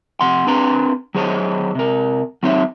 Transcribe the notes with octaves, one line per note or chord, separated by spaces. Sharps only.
F2 C3 F#5 C6
C4 D4 B4 G5 A#5 C6
F#3 G#4 C5 C#5 D#5
C3 A#4
F#3 C4 D#4 C#5 E5